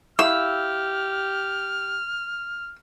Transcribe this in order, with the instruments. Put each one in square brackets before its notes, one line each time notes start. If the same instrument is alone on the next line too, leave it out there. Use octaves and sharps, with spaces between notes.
[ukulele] E4 F5 [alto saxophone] G4 [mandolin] E6 [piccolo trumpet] F6